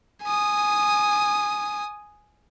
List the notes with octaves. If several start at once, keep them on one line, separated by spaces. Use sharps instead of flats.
G#5 D#6